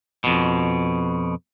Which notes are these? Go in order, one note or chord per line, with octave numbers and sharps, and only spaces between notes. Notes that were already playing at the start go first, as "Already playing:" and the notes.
F2 B2